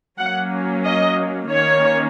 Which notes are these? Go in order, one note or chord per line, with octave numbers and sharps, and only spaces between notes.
F#3 A#3 C#4 F#5
D#5
D#3 A#3 C#4 C#5